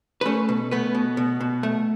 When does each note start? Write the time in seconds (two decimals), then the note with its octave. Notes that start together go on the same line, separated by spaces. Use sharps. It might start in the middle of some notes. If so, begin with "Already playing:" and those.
0.21 B4
0.25 A3 C#4 A4
0.49 B2
0.71 A3 B3 B4
0.95 B2
1.17 B2
1.41 B2
1.63 A3